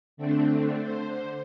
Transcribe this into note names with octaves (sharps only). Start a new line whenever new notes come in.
D3 A3 C4 D4
D3 C5